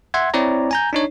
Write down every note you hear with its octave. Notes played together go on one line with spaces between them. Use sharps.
E5 F#5 C6 G#6
C4 E4 C#5 D5 A#5
G#5 A#5 G6
D4 D#4 C#5